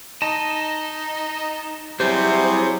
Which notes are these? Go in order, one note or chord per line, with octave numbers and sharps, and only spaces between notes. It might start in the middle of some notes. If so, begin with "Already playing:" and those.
D#4 D#5 A5
C3 F#3 G3 E4 G#4 C5